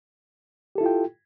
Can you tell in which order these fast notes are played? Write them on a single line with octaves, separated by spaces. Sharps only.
G4 A4 E4 F4 G5